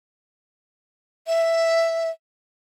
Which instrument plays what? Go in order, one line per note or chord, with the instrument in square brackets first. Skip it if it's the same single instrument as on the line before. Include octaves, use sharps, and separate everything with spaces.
[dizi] E5